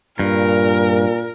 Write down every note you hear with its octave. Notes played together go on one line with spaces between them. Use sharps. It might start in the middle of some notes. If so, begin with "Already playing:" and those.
G2 A#2 A#4